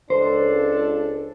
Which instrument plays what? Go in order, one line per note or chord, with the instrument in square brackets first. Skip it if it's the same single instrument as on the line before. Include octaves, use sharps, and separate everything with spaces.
[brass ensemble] C#2 D4 A4 [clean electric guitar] C5